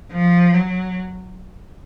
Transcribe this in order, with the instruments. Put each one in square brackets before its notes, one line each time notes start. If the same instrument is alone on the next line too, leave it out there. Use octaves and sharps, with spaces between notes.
[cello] F3
F#3